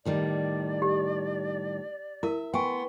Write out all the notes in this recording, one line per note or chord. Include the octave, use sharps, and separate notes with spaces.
A2 D#3 G3 D5
G4
E4 A#4 E5
B3 G5 G#5 C6 C#6